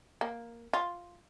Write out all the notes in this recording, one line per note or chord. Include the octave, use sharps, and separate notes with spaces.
A#3
F4